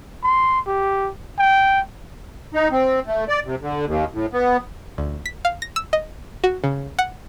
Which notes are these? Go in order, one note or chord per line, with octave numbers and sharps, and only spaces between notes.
C6
G4
G5
D#4
C4
A3
D5
C3
D3
D#2
A2
B3
D2
B6
F5
A#6
E6
D#5
F#4
C#3
F#5